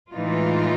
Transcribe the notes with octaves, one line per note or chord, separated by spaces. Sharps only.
A2 E3 G#3 D#4 F4